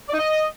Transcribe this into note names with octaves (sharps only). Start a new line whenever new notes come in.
D5
D#4
D#5